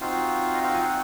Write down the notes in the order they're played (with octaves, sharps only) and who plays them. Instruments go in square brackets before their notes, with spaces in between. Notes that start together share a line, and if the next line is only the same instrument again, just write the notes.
[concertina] C4 D#4 F4 F#4 F5
D#5
F4 F5
G#5
F#4 F#5